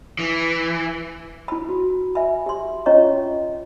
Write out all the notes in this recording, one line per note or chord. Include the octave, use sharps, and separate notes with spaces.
E3
E4 B5
F#4
E5 G#5 B5
G4 C6
C#4 F4 C#5 D#5 A#5 C#6